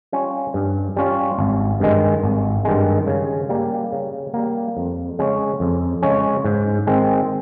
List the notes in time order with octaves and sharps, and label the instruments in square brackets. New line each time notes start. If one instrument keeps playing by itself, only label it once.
[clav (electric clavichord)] G3 C#4 F4
G2
G3 C#4 F4
G#1
G2 D#3 G#3
G#1
G2 D#3 G#3
C#3
G3 A#3
C#3
G3 A#3
F2
C#3 G#3 C#4
F2
C#3 G#3 C#4
G#2
D#3 G#3 C4